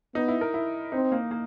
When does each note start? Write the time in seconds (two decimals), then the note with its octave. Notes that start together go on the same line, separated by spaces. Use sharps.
0.15 B3 D#4
0.28 E4
0.41 A#4
0.54 E4
0.92 C4 D#4
1.12 A#3
1.31 A#3